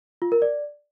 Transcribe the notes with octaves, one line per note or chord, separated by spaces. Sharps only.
F4
A#4
D5